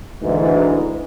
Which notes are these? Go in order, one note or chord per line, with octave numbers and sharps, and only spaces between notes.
D2 G#2 E3